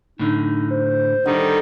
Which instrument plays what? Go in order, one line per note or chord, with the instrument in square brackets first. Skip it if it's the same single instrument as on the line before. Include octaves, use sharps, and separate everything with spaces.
[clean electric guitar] A2 D3 [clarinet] D#4
[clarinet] C5
[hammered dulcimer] D3 [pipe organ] D#3 G3 D#4